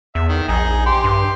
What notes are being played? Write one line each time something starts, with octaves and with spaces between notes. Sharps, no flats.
E2 E5
D#3
A#1 D#4 G#4
G4 C6
G2